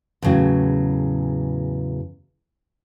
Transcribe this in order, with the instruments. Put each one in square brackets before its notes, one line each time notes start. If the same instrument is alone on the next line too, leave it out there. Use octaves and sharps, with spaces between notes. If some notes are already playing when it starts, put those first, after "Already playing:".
[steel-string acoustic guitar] E2 A2 C#3 F#3